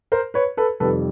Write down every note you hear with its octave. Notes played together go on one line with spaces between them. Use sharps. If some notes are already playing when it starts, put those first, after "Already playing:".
A#4 C5
B4 C#5
A4 B4
F2 C3 D#3 G3 A4 B4